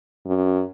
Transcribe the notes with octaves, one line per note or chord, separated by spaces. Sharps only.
F#2